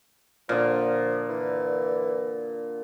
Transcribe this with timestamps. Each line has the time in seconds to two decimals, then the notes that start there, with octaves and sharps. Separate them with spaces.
0.49 A#2 D3 F3
1.29 E3